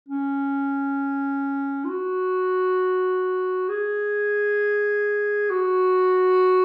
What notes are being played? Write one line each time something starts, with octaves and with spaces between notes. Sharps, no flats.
C#4
F4
F#4
G#4
F#4